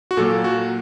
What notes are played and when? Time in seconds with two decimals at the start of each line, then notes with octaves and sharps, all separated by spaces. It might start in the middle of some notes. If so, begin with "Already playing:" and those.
0.11 F#4
0.17 A#2 F#3 A#3 A4
0.44 F#4